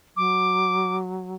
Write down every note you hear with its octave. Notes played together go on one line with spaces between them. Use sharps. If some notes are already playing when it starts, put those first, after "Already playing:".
F#3 D6